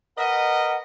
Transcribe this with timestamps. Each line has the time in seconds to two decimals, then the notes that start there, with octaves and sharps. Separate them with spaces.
0.18 A#4 B4 D#5 F#5